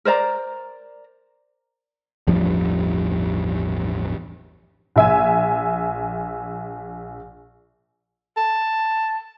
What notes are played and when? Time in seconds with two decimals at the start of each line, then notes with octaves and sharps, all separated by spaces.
0.05 A#4 C5 D5 A#5
2.27 A1 E2 G2 F3
4.96 A#1 E5 G#5
8.37 A5